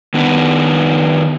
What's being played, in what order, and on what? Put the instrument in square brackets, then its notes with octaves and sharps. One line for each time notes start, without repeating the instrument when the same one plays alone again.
[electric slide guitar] D#3 B3 D4 B4